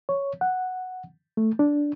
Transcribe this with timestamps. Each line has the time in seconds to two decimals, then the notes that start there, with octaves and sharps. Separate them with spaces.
0.09 C#5
0.41 F#5
1.37 A3
1.59 D4